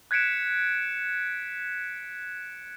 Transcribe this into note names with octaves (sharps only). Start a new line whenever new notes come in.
F#6 G#6 B6 C#7 D7 E7